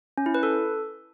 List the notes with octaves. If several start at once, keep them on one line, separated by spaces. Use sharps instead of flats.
C#4
E4
B4
A4